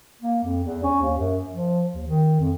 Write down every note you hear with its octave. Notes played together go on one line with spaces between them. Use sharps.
A#3
F2
E2
C#4
D#2
F#2
F3
D#2
D#3
F2